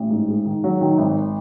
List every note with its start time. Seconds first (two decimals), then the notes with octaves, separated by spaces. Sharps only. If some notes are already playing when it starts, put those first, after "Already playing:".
Already playing: A1
0.10 G#2
0.28 G#3
0.46 D#3
0.64 F#3
0.81 D#3
0.98 G#1